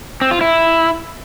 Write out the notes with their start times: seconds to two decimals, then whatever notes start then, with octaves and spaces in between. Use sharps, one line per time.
0.21 C4
0.31 F4
0.41 E4